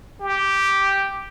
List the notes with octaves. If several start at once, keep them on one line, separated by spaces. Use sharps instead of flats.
G4